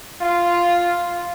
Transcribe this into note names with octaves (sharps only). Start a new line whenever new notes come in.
F4